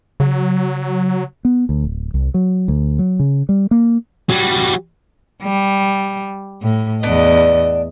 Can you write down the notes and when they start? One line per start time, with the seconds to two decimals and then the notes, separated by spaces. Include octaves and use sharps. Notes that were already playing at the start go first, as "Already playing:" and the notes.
0.20 C#3 F#3
1.45 B3
1.69 D2
1.84 D1
2.14 C2
2.34 F#3
2.68 D2
2.99 F#3
3.20 C#3
3.49 G3
3.71 A#3
4.30 F#3 G3
5.43 G3
6.62 A2
7.03 E2 B3 D4 D5 D#5